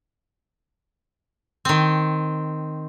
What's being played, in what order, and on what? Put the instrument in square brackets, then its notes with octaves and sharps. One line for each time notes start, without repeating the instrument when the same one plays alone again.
[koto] D#3 C4